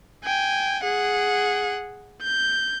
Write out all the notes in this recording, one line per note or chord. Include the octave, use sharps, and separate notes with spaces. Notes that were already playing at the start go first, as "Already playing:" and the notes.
G5 G#5
G#4 F#5
G6